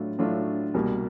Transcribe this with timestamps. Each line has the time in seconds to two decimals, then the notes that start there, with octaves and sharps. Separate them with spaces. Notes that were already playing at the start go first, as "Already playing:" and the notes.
Already playing: A2 F#3 A3 D4 F4
0.19 A2 F#3 A3 D4 F4
0.74 C2 B2 G3 A#3